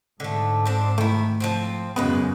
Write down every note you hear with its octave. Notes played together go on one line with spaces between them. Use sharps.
G#2 D3 A3
C4 D4 C5
D#3 A3 E4
F3 F#3 C4
F#2 A#2 C#3 G#3 B3 B4